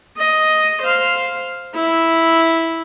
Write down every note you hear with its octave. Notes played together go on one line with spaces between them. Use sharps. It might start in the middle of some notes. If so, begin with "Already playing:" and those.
D#5
C5 F5
E4